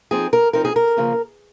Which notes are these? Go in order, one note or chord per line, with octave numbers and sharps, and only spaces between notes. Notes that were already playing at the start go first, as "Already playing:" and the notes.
F3 C4 D#4 G#4
A#4
F3 C4 D#4 A#4
G#4
A#4
C#3 F3 A#3 C#4